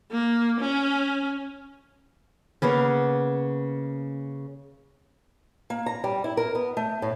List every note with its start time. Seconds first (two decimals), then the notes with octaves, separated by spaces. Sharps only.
0.11 A#3
0.60 C#4
2.62 C#3 A#3 B3 C#4
5.70 A#3
5.86 A#5
6.04 G3
6.24 E4
6.37 A#4
6.55 B3
6.77 A3
7.02 A2